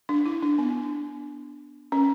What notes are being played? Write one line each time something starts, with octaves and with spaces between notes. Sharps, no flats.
D4
E4
D4
B3
C#4